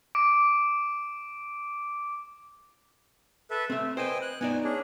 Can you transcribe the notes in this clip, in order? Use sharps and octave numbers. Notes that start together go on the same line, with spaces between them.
D6 D7
A4 B4 E5
A3 C4 E5
B4 C5 D#5 G5 G#5
F#6
B3 D#4 D5 G#5
C#4 D4 G#4